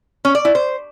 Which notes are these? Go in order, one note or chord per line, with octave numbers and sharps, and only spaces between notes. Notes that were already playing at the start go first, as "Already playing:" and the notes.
C#4
D5
E4
C5